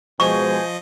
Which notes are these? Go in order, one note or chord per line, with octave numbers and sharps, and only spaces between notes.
B2 F3 G#3 C5 D#5 G#5 C#6